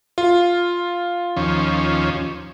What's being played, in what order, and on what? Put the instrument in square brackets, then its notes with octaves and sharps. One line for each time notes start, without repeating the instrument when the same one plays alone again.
[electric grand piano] F4
[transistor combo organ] D#2 F3 C#4